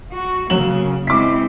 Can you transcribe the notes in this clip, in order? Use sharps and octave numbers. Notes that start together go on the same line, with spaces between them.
F#4
C#3 F#3 A#3 E7 F#7
G#3 C4 E4 D6 B6